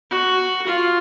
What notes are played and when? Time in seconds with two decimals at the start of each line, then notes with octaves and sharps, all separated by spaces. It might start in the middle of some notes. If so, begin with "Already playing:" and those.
0.11 F#4
0.66 F4